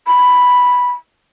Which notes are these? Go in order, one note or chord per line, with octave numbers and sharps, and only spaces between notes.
B5